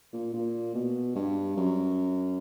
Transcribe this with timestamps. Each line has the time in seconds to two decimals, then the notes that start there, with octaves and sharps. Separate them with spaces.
0.13 A#2
0.33 A#2
0.74 B2
1.15 G2
1.57 F#2